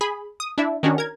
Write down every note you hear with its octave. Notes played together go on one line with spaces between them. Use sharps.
G#4 B5
D#6
D4 E4 E5
D#3 C#4 D4 F#4
A#4 G#6